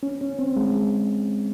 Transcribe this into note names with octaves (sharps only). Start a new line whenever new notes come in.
C#4
C#4
C4
G#3